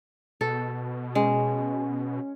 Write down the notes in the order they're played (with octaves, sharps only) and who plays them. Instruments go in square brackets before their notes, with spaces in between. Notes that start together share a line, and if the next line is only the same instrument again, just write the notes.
[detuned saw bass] B2 [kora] A4
[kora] G#3 [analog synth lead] C#4